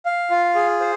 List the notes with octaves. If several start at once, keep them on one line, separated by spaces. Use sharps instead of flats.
F5
F4
G#4
C5